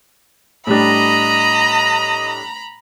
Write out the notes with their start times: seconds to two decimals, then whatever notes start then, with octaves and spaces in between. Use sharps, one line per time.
0.67 A2 G3 D4 D#5 A#5 B5